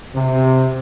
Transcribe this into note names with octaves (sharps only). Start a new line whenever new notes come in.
C3